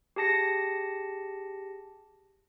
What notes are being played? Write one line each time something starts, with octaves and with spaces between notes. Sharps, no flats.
G4 G#4 A5 A#6 C#7